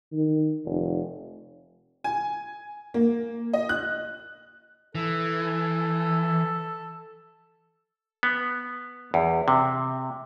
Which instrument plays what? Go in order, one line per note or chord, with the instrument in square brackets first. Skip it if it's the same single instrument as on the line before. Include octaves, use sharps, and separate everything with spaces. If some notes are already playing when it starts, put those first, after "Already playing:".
[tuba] D#3
F1
[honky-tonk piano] G#5
A#3
D#5
F#6
[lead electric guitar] E3 [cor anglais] A4
[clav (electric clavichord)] B3
E2
C3